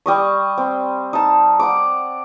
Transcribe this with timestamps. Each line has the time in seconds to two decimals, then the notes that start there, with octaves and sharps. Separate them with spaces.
0.06 G3 D#5 C#6
0.58 C4
1.13 D#4 A5
1.60 F#5 D6